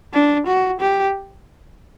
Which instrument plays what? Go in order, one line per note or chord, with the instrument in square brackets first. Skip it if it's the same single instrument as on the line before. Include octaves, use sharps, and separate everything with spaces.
[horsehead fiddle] D4
F#4
G4